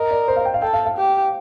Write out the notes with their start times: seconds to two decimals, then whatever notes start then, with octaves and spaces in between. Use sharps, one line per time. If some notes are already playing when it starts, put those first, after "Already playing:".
Already playing: A#4 D#5
0.11 D5
0.28 C5
0.36 F5
0.45 G5
0.54 F5
0.62 A4 G5
0.73 F5
0.86 F5
0.97 G4